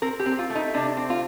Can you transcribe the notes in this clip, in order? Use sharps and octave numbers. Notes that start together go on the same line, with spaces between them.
C4 A#4
G4
C4
G4
F4
A3
D#4
C3 D4
C4
F4